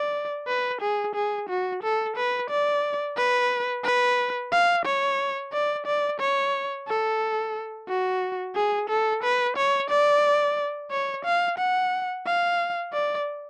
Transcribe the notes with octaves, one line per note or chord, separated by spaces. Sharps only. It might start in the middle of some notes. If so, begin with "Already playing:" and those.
Already playing: D5
B4
G#4
G#4
F#4
A4
B4
D5
B4
B4
F5
C#5
D5
D5
C#5
A4
F#4
G#4
A4
B4
C#5
D5
C#5
F5
F#5
F5
D5